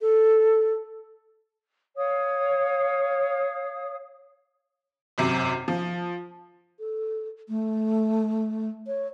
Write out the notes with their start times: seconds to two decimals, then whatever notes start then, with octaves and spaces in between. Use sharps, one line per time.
0.01 A4
1.95 C#5 F5 D#6
5.18 G#1 F#2 C3
5.68 F3
6.80 A4
7.49 A3
8.87 C#5